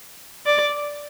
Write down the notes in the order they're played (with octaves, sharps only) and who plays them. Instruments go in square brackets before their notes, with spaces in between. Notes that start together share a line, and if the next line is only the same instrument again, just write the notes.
[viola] D5